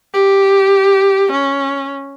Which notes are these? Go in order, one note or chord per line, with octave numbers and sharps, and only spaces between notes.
G4
C#4